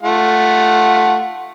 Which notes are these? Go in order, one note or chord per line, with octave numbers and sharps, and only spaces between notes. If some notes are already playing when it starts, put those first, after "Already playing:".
A3 F4 F#5